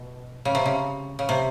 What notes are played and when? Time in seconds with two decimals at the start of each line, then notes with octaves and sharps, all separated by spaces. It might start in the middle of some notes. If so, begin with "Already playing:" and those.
Already playing: B2
0.45 C#3
0.55 C3
0.66 C#3
1.19 C#3
1.29 C3